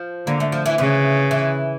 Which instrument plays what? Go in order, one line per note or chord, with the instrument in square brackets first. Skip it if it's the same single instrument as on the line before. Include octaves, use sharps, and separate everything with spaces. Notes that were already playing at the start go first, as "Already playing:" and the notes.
Already playing: [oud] F3
[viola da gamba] D3 [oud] A#3
[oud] A3
F3
E3
[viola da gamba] C#3 [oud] E3
[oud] E3